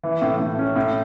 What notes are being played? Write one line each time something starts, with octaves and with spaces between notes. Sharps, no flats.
E3
A2
A2
C#4
A2